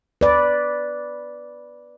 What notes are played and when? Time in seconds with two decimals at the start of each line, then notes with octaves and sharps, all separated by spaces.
0.21 B4 D5